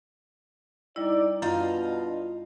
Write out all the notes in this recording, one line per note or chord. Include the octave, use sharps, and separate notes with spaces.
C3 G3 D#4 E4 D5
F#2 B2 B3 D4 F4 D#5 F5 G6